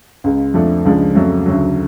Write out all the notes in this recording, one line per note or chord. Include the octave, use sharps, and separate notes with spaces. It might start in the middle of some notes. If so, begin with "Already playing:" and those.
C#2 C#3 G#3
F2 F3 A3 D4
C#2 C#3 F3 G#3 D4
F2 C#3 F#3 A3
D2 C#3 F#3